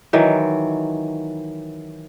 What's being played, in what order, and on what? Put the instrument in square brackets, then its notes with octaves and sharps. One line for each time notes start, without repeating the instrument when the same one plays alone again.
[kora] D#3 E3 F#3